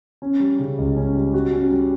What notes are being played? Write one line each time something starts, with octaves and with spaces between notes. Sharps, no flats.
C#4
G3
C#3
C#2
C#4
G3
F#4
C#4
G3